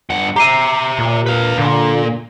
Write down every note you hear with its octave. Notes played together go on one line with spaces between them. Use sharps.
G2 F#5
G4 E5 A#5 C7 D#7
A#2
B4 F5
A#2 D3